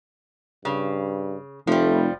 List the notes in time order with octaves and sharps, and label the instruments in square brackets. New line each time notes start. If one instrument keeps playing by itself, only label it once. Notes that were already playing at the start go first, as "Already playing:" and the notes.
[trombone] G2 [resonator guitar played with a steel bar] C#3
[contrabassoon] F1 [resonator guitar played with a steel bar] F3 G3 [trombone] A3